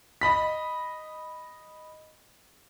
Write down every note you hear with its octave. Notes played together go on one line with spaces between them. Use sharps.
D#5 B5 B6